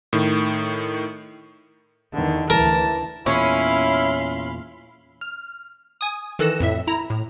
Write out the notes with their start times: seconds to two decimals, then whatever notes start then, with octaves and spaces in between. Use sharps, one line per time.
0.13 A2 D#3
2.14 E2 D3 D#3
2.50 D2 C#3 E3 A#4 A5
3.26 E2 A#2 C#4 E4 F5 B5 C6
5.21 F6
6.01 G#5 D#6
6.39 D#3 E3 A4 F#6 A#6 E7
6.60 F2 A2 E5
6.87 E4 A#5
7.10 A2